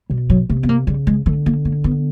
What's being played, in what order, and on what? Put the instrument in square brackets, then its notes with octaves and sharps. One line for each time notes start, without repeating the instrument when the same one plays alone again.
[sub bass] B2 [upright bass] G3
[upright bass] F#3
[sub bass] C3 [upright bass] A3
[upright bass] B3
A#3
[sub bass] C#3 [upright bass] G3
[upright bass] G#3
[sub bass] D3 [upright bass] A3
[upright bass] A#3
A#3
B3